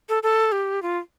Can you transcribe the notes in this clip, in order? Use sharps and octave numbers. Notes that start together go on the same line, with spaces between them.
A4
A4
G4
F4